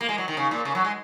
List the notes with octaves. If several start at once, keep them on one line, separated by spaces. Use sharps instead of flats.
A#3
G#3
F#3
D#3
C#3
A#2
C#3
F#3
G#3